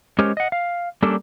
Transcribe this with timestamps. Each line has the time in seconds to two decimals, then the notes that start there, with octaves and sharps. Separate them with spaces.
0.19 G#3 C#4 G4 A#4 C5 C#5
0.37 D#5 F#5
0.52 F5
1.02 G3 A#3 C#4 D4 G4 A4